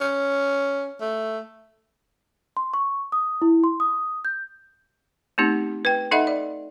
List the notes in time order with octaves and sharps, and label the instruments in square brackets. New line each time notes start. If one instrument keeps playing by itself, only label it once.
[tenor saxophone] C#4
A3
[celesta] C6
C#6
D#6
E4
C6
D#6
G6
[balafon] A3 B3 C4 D#4 G4
B4 G5
D#4 A4 D#5 E5 F#5 B5
D5